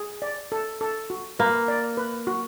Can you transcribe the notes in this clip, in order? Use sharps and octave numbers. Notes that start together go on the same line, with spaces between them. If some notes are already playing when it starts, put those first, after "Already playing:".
Already playing: G#4
D5
A4
A4
F#4
A#3 B4
D5
B4
F#4